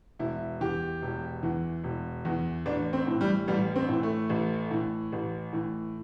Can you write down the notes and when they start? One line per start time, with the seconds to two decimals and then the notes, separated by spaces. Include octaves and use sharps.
0.19 E1 E4
0.60 E2 E3 G4
1.02 E1
1.43 E2 E3
1.84 E1
2.25 E2 E3
2.66 A1 D4
2.93 C4
3.07 A2 E3
3.21 G3
3.48 A1 G3
3.76 C4
3.89 A2 E3
4.03 A3
4.30 A1
4.71 A2 E3
5.12 A1
5.53 A2 E3